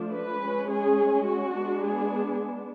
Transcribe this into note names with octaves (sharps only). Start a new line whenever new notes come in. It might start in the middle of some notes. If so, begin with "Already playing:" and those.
Already playing: F3 A3 D4
B4
G#3 C#4
G#4
F#4
G#3 B3 D4
G#4